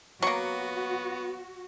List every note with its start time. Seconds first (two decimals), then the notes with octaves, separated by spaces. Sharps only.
0.22 F#3 A#3 B3 F#4 C#6